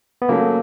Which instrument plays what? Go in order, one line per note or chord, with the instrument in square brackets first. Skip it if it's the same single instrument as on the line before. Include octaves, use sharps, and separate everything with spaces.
[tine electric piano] B3
[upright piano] C#3 F#3 A3 [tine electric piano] A#3